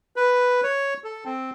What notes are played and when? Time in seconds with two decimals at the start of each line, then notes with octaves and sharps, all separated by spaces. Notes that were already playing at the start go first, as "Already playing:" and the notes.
0.16 B4
0.63 C#5
1.04 A4
1.25 C4